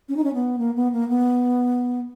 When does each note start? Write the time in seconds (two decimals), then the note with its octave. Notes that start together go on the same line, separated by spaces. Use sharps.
0.09 C#4
0.17 D#4
0.24 C#4
0.34 B3
0.59 A#3
0.76 B3
0.92 A#3
1.09 B3